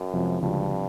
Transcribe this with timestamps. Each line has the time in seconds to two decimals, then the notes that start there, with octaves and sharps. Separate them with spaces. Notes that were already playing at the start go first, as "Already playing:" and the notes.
Already playing: F#2
0.13 F2 C3 F3 G#3
0.41 D2 G2 C#3 F3 G#3
0.69 C3 F3